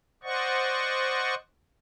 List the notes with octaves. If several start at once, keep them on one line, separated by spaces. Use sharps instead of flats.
C5 D5 D#5 F#5 C#6